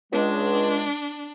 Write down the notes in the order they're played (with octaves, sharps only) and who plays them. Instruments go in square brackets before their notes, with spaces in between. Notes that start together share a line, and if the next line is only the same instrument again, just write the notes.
[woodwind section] C#2 G#3 [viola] D4